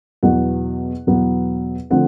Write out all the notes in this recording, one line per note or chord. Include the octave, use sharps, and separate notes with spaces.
E2 B2 F#3 B3 F#5
E2 B2 F#3 B3
D3 F3 A3 C4 F#5